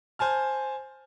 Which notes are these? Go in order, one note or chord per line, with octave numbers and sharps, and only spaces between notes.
C5 G#5 A5 F6